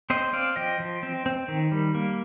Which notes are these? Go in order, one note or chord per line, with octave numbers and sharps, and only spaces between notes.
C4 C5 D#5
C4 D5 F5
F3 D#5 G5
F3
C4
C4
D#3
G3
A#3